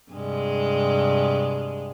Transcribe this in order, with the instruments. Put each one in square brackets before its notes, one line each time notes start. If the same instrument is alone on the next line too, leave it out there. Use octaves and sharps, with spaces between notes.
[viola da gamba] G2 C3 G#3